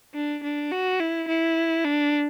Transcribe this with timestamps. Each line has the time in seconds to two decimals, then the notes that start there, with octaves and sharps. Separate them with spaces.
0.14 D4
0.44 D4
0.72 F#4
1.00 E4
1.28 E4
1.85 D4